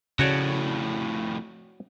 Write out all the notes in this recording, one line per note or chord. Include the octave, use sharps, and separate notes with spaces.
F2 A2 C#3 F#4 C#5 D5